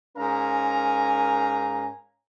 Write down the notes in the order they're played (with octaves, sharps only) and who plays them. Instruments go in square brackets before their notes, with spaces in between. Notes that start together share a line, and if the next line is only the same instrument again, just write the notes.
[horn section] G#2 C#4 A#4 F5 G#5 A#5